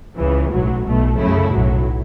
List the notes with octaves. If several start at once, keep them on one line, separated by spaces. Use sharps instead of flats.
C#2 C#3 E3
B1 A2 F#3
B1 B2 A3
F#2 C#3 A3 E4
B1 A2 F#3